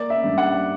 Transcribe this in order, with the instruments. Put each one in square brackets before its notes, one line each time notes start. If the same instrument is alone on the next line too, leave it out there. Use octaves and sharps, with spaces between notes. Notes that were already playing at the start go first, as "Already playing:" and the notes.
Already playing: [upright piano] A#3 D5
E5
G2
F#5